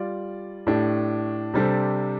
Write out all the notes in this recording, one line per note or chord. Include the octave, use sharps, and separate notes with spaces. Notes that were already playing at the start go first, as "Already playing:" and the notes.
Already playing: G3 F4 D5
A2 A3 D4 G4
C3 G3 D4 A4 C5